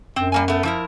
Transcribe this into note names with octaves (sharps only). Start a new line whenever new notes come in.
F#2 C4
G3 A#3 G#5
A3 B3
F3 E4 A#4